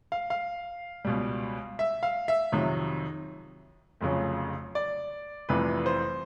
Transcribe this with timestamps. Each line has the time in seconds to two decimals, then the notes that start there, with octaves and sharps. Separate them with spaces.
0.12 F5
0.30 F5
1.05 C#2 B2 G3
1.79 E5
2.03 F5
2.28 E5
2.52 F2 C3 D#3 F#3
4.01 F1 F2 C#3 F#3
4.75 D5
5.49 F1 F2 C3 E3 G3 B4
5.86 C5